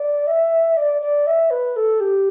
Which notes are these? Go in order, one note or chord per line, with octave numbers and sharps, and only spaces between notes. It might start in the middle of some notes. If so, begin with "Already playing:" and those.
Already playing: D5
E5
D5
D5
E5
B4
A4
G4